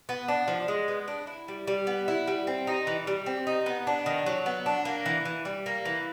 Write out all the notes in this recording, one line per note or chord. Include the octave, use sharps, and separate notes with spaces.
B3
D4
F3
G#3
B3
D4
E4
G3
G3
B3
E4
G3
C4
D#4
E3
G3
C4
D#4
B3
D4
D#3
F#3
B3
D4
A#3
E3
E3
G3
A#3
E3